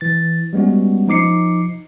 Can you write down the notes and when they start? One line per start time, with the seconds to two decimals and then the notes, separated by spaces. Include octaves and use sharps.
0.01 E3 A6
0.53 G3 G#3 B3 C#4 F#4
1.08 F3 D#4 D6 C7 C#7